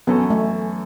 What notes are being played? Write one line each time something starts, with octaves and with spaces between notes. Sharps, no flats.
F#2 E3 B3 C#4 A4
A3